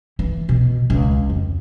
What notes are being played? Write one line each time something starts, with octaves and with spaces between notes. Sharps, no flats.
E3
B2
C#2
F2